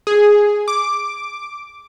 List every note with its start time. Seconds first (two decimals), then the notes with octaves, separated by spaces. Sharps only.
0.07 G#4
0.68 D6